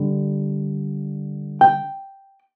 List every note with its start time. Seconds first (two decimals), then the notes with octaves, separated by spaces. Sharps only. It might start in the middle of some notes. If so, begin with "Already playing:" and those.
Already playing: D3 G3
1.61 G5